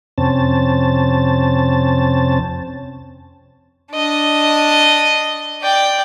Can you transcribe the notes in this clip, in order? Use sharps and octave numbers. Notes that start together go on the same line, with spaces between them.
F2 C3 C4 C#4 A5
D4 D#5
D5 G5